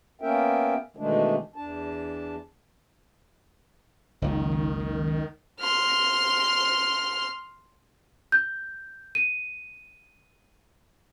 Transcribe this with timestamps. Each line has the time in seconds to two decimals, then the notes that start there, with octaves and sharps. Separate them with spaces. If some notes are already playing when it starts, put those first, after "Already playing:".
0.21 A#3 B3 C#4 A#4 E5 G5
0.97 B2 D#3 E3 G#3 A3 D4
1.56 E2 D4 A5
4.22 F#1 C#2 D#3
5.60 C6 F6
8.32 G6
9.15 D#7